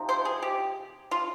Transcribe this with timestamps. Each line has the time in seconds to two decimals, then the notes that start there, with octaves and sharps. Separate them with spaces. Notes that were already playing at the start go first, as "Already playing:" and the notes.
Already playing: C3 F3 D#4
0.09 C5
0.25 G#4
0.42 G4
1.11 F4